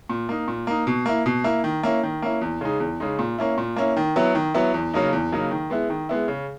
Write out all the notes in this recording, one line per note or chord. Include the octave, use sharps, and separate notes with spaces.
A#2
A#3 D#4
A#2
A#3 D#4
B2
A#3 E4
B2
A#3 E4
D#3
A#3 C#4 E4
D#3
A#3 C#4 E4
E2
C#3 G#3 D#4
E2
C#3 G#3 D#4
A#2
A#3 C#4 E4
A#2
A#3 C#4 E4
D#3
F#3 B3 E4
D#3
F#3 B3 E4
E2
C#3 F#3 A#3 D#4
E2
C#3 F#3 A#3 D#4
D#3
G#3 B3 E4
D#3
G#3 B3 E4
C#3